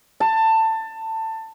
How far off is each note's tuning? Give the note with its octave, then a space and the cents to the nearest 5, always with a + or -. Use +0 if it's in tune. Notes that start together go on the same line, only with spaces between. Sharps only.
A5 +20